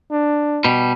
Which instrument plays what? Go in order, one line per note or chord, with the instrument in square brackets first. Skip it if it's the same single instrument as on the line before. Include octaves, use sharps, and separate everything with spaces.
[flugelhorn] D4
[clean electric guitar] B2 G3